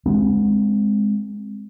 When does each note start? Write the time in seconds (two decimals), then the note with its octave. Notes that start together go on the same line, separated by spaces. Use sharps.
0.06 G#3 C4